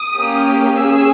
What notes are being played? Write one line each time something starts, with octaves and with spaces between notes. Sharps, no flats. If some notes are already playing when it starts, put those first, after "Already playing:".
Already playing: D#6
A#3 C#4 G4
C#4 G#4 E6